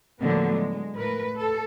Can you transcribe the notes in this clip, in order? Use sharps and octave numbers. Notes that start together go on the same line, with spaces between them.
A2 D3 F3 F#3 A#3 B3
G#3
A2 A#4 B4
A4